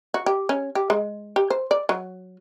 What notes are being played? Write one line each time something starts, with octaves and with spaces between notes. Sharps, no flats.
F#4
G4
C#4
G4
G#3
G4
C5
D5
F#3